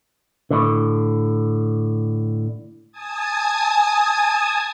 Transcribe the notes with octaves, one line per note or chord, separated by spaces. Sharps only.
A2 D3
G#5 A5 D#6 G#6